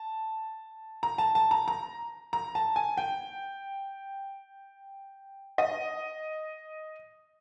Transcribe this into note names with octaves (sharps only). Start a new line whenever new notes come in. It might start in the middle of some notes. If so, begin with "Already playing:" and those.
Already playing: A5
A#5
A5
A5
A#5
A#5
A#5
A5
G#5
G5
D#5